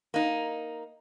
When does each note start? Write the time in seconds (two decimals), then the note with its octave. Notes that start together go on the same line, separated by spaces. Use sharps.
0.14 A#3 D#4